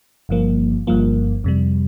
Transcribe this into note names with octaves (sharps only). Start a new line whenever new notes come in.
G1 G2 F3 A#3
G1 G2 F3 A#3
F2 C3 G3